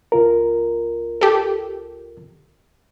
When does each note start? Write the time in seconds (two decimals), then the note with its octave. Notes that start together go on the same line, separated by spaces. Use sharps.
0.12 C#2 F4 A#4
1.21 G4 A4